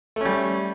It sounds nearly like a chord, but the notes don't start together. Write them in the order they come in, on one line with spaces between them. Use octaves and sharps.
A3 C#4 G3